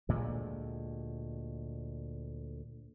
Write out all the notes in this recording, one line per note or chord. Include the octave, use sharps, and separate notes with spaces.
D2 A#2 G#3